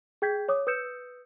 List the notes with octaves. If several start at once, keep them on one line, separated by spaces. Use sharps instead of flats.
G#4 G5 G6 G#6 B6
C#5 D6 D#6
B4 D#6 E6 G6 C#7 E7